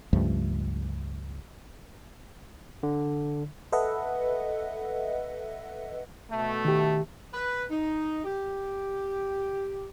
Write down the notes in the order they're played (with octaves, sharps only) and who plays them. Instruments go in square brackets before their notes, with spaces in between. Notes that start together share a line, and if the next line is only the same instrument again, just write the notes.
[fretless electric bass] C#2 G2 F3 A3
[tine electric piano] D3
[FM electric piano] A4 B4 D#5 E5 F#5
[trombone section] B2 A3
[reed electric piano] D#3 G4
[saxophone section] B4
D#4
G4